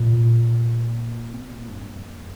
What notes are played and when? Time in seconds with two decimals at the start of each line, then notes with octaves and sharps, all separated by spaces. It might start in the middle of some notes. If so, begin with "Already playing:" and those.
Already playing: A#2
1.33 C3
1.41 A#2
1.68 G2
1.95 F2